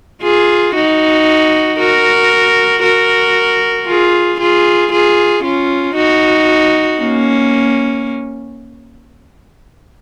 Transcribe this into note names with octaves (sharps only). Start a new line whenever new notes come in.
F4 G#4
D#4 F#4
F#4 A#4
F#4 A#4
F4 G#4
F4 G#4
F4 G#4
C#4 F4
D#4 F#4
A#3 C#4